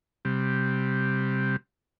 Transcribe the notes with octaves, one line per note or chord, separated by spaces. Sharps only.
C3 G3